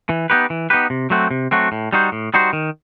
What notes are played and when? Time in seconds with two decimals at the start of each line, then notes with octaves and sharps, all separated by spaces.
0.09 E3
0.30 B3 D#4 G4 B4
0.50 E3
0.70 B3 D#4 G4 B4
0.90 C3
1.10 F#3 A3 C4 F#4
1.31 C3
1.51 F#3 A3 C4 F#4
1.72 A2
1.93 G3 D#4 F#4 C5
2.12 A2
2.34 G3 D#4 F#4 C5
2.53 D#3